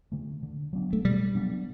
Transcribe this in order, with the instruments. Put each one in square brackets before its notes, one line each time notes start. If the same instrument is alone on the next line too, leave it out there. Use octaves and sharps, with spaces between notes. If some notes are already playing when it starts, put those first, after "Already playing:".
[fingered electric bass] D3 A3
D3
F#3 B3 D4
[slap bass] A3
[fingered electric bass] B2 [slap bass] G3
[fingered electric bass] F#3 B3 D4